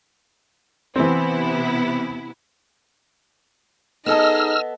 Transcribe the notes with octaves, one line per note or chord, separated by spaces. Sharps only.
C3 E3 B3 C4 E4
B3 D#4 G#4 A4 D#5 A5 E6 F6